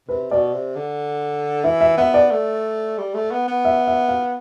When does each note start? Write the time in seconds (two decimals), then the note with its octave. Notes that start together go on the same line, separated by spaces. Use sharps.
0.09 C3 B4
0.31 B2 D5
0.54 C3
0.76 D3
1.64 E3 E5
1.81 E5
1.98 B3 E5
2.14 D5
2.31 A3
2.98 G3
3.14 A3
3.31 B3
3.48 B3
3.65 E5
3.87 E5
4.08 F5